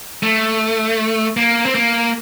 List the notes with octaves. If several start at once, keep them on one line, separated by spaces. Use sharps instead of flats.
A3
A#3
C4
A#3